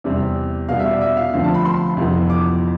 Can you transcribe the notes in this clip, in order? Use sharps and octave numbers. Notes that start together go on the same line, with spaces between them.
E2 C3 G3 C4
B2 G3 B3 F5
E5
D5
E5
F5
D2 D3 F3 C4 F5
A5
B5
C6
F2 C3 E3 B3
D6